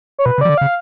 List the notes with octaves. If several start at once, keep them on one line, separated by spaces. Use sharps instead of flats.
C#5
B2 B4
C#3
F3 D5
D3
C#3 F5